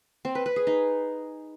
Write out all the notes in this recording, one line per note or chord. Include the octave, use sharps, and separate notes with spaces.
C4
B4
B4
G#4
D#4